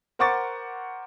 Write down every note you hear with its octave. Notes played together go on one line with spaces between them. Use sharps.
A#4 C5 F#5 C#6 D6 A6